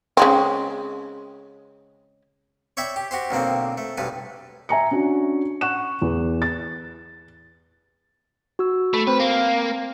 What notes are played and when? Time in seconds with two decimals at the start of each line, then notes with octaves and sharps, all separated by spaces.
0.17 C#3 G#3 C4
2.77 C#5 D5 E5 G5 B5
2.96 G4
3.11 F#4 G4 C5
3.31 B1 D3 A#3 C4
3.78 A3
3.98 B1 G2 D3 B4
4.69 E5 G#5 A#5 C#7
4.91 C#4 D4 F#4
5.61 F#5 C#6 F#6 E7
6.02 E2
6.42 A6
8.59 F#4 E6
8.94 A3 B5
9.07 C4 B4 C5
9.20 A#3